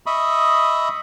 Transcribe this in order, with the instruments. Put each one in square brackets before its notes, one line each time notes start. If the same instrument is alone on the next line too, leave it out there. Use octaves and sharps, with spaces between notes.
[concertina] D#5 E5 B5 C#6 D#6